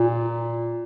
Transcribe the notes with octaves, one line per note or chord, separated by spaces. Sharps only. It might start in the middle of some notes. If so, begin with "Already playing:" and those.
Already playing: A#2